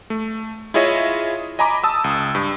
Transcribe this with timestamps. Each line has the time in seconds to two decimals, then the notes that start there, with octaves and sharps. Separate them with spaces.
0.10 A3
0.74 E4 F4 G#4 C#5 D#5 E5
1.59 D#5 G#5 A#5 B5 D6
1.84 A5 D#6 E6
2.04 C#2
2.35 G2